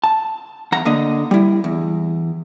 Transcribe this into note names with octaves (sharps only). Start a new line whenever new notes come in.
A5
E2 F#5 A#5
D3 A#3 D#5
G3 E4
E2